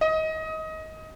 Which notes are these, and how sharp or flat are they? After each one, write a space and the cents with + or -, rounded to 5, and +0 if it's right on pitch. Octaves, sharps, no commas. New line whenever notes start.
D#5 +25